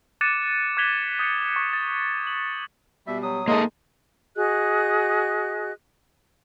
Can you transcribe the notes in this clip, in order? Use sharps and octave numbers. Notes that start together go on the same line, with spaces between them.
D6 F#6 A6 C#7 D#7 E7
D6 F#6 G#6 B6 F7 G7
D#6 G6 C#7
C#6
A6
F#7
B2 G3 E5
F#3 D#6
G#2 G#3 A#3 A4 D#5
F#4 G#4 D#5 F#6